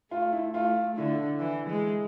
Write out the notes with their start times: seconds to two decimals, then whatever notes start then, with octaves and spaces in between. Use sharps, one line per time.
0.11 A3 F4
0.32 E4
0.54 A3 F4
0.97 D3 E4
1.40 E3
1.69 G#3